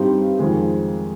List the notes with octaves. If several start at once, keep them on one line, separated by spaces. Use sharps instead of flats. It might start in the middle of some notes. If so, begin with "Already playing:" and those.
Already playing: G2 G3 C4 D#4 G4
F2 D#3 G#3